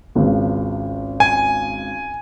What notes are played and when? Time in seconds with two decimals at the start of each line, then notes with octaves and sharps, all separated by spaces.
0.15 G#1 C#2 C#3
1.20 G#5